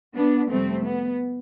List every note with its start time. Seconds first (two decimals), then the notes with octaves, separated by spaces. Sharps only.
0.14 B3 D4
0.49 F2 C3 G3 A3 C4
0.84 B3